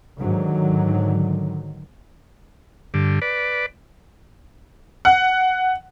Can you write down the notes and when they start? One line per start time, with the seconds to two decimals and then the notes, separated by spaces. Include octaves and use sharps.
0.19 G#2 D3 D#3 F#3
2.94 G2 D3
3.22 B4 D5
5.05 F#5